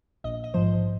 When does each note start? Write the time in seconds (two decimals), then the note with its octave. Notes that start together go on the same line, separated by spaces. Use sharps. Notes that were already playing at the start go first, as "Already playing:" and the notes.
0.24 A#1 D#5
0.44 D#5
0.54 G#2 F3 C5